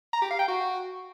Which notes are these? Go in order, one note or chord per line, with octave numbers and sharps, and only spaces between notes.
A#5
G4
F5
G5
F#4